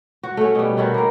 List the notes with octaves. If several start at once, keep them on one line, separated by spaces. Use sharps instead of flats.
F#4
A3 C#4
B2 G3
D#3 C#4 E4 F#4
A#3 A#4